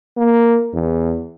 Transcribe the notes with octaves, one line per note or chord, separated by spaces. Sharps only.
A#3
E2